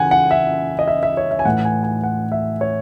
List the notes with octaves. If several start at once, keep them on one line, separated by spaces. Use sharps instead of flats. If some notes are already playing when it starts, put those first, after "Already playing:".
Already playing: C#3 E3 F#5 G#5
F#5
E5
D#5
E5
E5
C#5
E5
G#5
A2 E3 F#5
G#5
G#5
F#5
E5
C#5